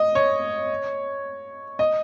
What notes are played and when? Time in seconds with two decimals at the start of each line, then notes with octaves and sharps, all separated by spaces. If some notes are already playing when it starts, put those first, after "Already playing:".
Already playing: D#5
0.15 C#5
1.79 D#5